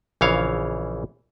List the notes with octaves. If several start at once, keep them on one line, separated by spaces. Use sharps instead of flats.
A#1 C#3 E3 C#5 F5